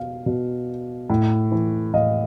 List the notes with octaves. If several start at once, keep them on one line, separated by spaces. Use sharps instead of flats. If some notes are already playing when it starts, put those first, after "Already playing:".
Already playing: B2 F5
B2
A2
E3
A2 D#5 F5